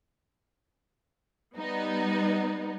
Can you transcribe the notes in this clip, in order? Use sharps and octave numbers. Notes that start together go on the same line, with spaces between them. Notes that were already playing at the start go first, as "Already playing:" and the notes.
G3 B3 D#4